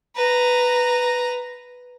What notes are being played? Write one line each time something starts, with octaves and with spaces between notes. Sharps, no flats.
B4 A#5